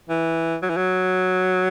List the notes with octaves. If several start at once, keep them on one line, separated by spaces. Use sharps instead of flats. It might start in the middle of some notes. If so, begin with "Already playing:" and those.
E3
F#3
E3
F#3